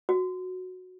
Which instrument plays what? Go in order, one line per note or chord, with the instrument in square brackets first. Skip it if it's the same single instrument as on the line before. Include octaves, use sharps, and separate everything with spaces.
[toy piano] F#4